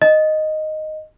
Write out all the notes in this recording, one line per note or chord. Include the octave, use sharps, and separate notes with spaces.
D#5